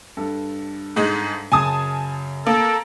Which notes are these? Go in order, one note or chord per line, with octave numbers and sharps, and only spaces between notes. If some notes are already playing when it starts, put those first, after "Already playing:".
G2 A4
G#2 G#3 D#4
F#2 C#3 G#5 A5 D#6
A#3 A4